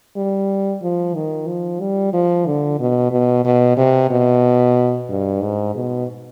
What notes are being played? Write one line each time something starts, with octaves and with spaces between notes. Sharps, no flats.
G3
F3
D#3
F3
G3
F3
D3
B2
B2
B2
C3
B2
G2
G#2
B2